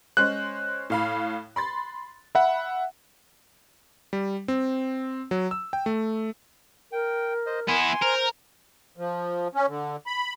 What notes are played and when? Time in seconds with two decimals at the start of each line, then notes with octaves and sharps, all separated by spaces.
0.17 G#3 C#4 C5 F#6
0.90 A2 F5 B5
1.56 B5 C6 A6
2.35 E5 F#5 B5
4.13 G3
4.48 C4
5.31 F#3
5.51 E6
5.73 G5
5.86 A3
6.92 A#4 G5
7.46 C5 D#5
7.68 B3 E4 G#5 C6
8.02 A#4 C5
8.97 F3
9.55 C#4
9.68 D3
10.07 B5